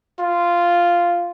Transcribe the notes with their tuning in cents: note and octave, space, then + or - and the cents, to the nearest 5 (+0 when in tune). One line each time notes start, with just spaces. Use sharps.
F4 -5